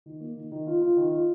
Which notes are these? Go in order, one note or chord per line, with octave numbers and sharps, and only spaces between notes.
D#3
A#3
D#3
D#3
F4
F4
D#3
F4